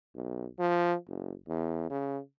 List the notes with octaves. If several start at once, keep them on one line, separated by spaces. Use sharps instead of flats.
B1
F3
F#1
E2
C#3